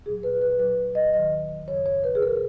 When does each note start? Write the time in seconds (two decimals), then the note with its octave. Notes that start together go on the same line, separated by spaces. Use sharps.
0.06 A#2 F#3 G#4
0.23 B4
0.42 B4
0.59 A#2 F#3 B4
0.95 D#5
1.13 D#2 D#3 F#3 D#5
1.68 F#2 C#3 F#3 C#5
1.86 C#5
2.04 B4
2.15 G#4
2.22 A#2 F#3 A#4